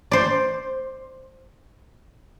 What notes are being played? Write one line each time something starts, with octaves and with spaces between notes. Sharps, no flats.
C5 D5